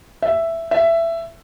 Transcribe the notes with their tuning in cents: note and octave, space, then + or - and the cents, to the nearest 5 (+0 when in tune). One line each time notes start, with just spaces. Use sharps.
E5 +5
E5 +15